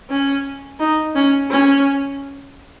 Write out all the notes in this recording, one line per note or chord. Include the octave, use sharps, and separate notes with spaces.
C#4
D#4
C#4
C#4